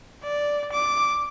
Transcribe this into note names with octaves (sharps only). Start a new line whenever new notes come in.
D5
D6